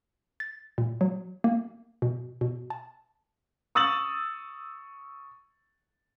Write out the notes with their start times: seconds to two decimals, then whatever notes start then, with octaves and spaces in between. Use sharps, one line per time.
0.40 A6
0.78 A#2
1.01 F#3
1.44 A#3
2.02 B2
2.41 B2
2.70 A5
3.75 C#6 D#6 E6 A6 F#7